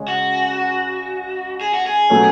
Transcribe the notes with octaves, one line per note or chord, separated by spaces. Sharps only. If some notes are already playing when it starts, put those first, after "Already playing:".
Already playing: C#3 G#3 C#4
F#4
G#4
F#4
G#4
B2 F#3 A3 C#4